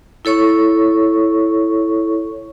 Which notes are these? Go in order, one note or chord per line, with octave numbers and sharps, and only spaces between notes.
E4 A4 C#5 C#6